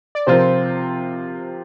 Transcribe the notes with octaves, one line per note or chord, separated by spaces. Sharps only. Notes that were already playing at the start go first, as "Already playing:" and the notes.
D5
C3 F3 C4 F4 A#4 C5